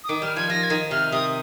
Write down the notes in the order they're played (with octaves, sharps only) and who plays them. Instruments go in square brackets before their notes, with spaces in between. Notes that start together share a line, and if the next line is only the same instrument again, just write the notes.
[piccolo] D#6
[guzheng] D#3 [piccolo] D6
[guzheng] G3 [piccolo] F6
[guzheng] F3 [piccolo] G#6
[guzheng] F3 [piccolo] A#6
[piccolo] G#6
[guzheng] D#3
[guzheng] C3 [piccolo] F6
[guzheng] C3 [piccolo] D#6